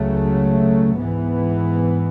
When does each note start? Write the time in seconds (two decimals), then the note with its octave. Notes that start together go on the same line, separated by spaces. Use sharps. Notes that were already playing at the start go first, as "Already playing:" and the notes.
Already playing: C#2 C#3 F#3 A3
0.97 G#2 E3 B3